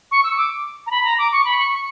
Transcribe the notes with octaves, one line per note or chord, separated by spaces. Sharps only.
C#6
E6
D6
A#5
B5
A#5
D6
C#6
B5
C#6
C#6